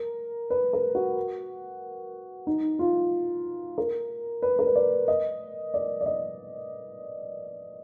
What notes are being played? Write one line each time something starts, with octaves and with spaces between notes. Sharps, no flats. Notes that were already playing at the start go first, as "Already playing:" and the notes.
Already playing: A#4
B4
A#4
F#4
D#4
F4
A#4
B4
A#4
B4
D5
D#5
D5
D5
D#5